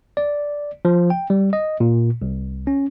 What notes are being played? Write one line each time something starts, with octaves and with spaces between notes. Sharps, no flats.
D5
F3
G5
G3
D#5
A#2
C2
C#4